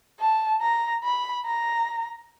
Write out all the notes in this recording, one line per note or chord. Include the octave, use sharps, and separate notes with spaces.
A5
A#5
B5
A#5